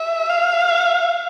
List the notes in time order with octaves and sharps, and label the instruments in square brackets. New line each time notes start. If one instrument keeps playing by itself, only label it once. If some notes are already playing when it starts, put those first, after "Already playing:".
Already playing: [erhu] E5
F5